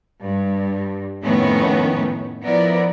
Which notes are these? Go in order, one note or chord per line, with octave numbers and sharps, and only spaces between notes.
G2
F2 A2 D#3 B3 C#4
F3 B3 E4 A#4 D5